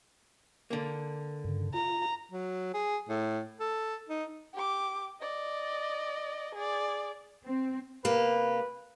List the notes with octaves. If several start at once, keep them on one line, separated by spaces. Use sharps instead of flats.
D3 A#3
G2 C#3
F4 A#5
F#3
G#4
A2
A4
D#4
G4 D6
D5 D#5
G#4 D5
C4
C3 A#3 G4 B4